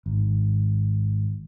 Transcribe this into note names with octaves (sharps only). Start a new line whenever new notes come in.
G#1